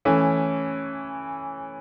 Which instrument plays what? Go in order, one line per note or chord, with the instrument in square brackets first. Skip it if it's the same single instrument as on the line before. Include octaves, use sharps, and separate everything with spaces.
[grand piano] E3 A3 C#4